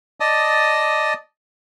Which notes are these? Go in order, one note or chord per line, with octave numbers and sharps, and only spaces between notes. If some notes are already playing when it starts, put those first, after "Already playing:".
D5 D#5 A5 D#6